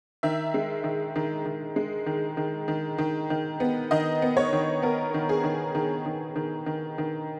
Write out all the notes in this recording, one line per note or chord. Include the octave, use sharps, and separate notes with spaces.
D#3 E5
G#3
D#3
D#3
D#3
G#3
D#3
D#3
D#3
D#3
D#3
B3
D#3 D#5
B3
C#5
D#3
B3 A#4
D#3
G#4
D#3
D#3
D#3
D#3
D#3
D#3